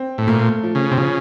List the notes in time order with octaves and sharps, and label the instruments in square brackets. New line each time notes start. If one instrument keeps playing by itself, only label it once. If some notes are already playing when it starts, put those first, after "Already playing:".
Already playing: [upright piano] C4
[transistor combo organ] A2
[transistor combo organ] A#2 [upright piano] A3
[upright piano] F3
[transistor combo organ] C#3
C3
[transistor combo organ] C#3 [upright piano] F3